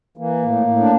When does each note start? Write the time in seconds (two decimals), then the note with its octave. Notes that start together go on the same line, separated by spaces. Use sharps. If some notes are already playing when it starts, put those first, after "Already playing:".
0.17 E3 A#3
0.43 A2
0.67 A2
0.80 D4